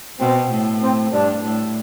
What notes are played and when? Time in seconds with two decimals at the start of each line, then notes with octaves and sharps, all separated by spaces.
0.19 B2 C4
0.50 A2
0.81 C4
1.11 G2 D4
1.43 A2